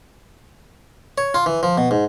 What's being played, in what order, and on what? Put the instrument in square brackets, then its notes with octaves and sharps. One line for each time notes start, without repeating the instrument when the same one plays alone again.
[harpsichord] C#5
F4
E3
F3
B2
G#2